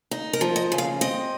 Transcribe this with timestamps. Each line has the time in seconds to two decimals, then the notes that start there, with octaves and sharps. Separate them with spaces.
0.11 D#4
0.33 A#4
0.41 F3
0.56 D#5
0.72 C#3
0.78 F5
1.01 C4 D#5